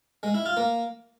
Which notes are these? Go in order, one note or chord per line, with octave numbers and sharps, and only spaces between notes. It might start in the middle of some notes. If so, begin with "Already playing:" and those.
G#3
E4
F4
A#3